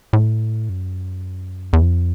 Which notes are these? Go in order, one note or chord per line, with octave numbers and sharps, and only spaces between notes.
A2
F#2
E2
F2